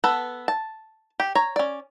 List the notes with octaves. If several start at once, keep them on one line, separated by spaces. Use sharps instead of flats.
B3 A4 B4
A5
G4
C#5 A#5
C#4 D5